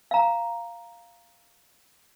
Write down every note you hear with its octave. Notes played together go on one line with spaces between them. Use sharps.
F5 A#5